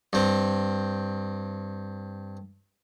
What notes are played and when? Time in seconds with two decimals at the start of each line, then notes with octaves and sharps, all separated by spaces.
0.13 G2 C4